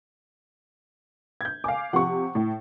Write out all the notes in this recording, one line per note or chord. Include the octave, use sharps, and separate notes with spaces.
G6 G#6
F5 G#5 D6
C3 F3 F#5 C#6
A2